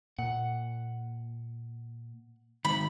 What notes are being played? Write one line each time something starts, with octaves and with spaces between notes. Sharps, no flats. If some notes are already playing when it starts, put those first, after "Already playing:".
A#2 F#5
D#3 G#3 B5